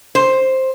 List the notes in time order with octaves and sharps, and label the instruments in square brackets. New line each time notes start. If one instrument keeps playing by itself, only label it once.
[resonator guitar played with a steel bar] C5